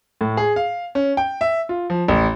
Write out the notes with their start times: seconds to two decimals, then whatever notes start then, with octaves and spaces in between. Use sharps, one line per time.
0.21 A2
0.37 G#4
0.56 F5
0.95 C#4
1.17 G5
1.41 E5
1.69 F4
1.90 F3
2.08 A1